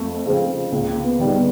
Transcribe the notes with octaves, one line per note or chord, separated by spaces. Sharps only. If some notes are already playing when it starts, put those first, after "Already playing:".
Already playing: F2 A3
C#3 F3 G#3 C4
C#2 A#3
B3
C3 D#3 G3
B3